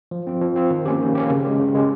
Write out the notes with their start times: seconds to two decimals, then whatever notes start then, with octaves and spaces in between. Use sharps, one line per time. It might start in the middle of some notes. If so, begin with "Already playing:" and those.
0.11 F3
0.27 C4 F4
0.41 F3
0.56 C4 F4
0.70 D#3
0.86 A#3 C#4 G4
1.01 D#3
1.15 A#3 C#4 G4
1.30 C#3
1.45 G#3 C#4 G4
1.60 C#3
1.75 G#3 C#4 G4